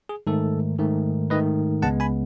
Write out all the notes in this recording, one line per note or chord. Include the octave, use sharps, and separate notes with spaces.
G#4
G#2 D#3 A3 A4
G#2 D#3 A3
G#2 D#3 A3 B4 D#5
C#2 C#3 G#3 B3 F#5 A5
G#5 B5